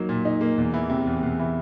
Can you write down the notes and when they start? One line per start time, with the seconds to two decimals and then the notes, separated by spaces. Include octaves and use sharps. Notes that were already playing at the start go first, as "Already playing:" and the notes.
Already playing: F#3 A#3 D#4
0.09 A#2
0.25 D#4
0.41 A#3
0.58 E2
0.74 E3
0.90 C3
1.07 E2
1.23 E2
1.39 E3